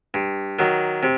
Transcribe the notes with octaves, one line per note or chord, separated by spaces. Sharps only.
G2
D#3 F#3
C3